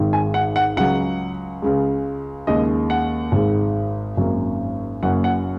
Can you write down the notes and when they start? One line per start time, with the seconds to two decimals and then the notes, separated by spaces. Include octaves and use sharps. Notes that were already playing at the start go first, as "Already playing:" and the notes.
Already playing: G#1 G#2 D#3 G#3
0.13 G#5
0.34 F#5
0.56 F#5
0.76 C#2 C#3 F#3 F#5
1.62 C#2 C#3 G#3
2.47 D#2 C#3 G#3 D#5
2.90 F#5
3.32 G#1 G#2 G#3
4.17 G#1 F#2 F#3 A#3
5.02 F#1 F#2 F#3 A#3 F#5
5.24 F#5